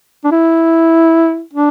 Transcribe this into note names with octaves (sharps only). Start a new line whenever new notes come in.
D4
E4
D4